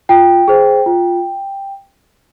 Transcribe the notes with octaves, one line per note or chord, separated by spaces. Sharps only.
F4 G5
G#4 C5
F4